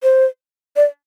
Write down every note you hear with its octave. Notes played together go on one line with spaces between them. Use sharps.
C5
D5